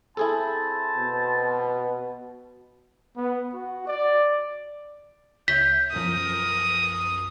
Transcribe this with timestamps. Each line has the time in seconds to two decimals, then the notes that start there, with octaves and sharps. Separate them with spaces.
0.17 C4 E4 G#4 A4 A5 B5
0.96 B2
3.17 B3
3.53 F#4
3.87 D5
5.48 C#2 C#5 E5 G6 B6
5.93 B1 F#2 F3 A#4 D#6